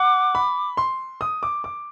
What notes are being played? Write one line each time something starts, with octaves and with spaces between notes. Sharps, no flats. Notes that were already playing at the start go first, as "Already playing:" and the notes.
Already playing: F#5 D6
B5
C6
D#6
D6
D6